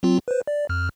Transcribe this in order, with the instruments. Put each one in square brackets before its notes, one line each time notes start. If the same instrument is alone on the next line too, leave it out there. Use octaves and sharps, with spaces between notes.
[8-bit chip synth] F#3 C4 F4
B4 C5
D5
F2 F6